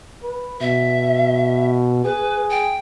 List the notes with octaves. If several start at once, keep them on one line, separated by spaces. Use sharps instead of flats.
B4
B2 E5
G#4 B4
G5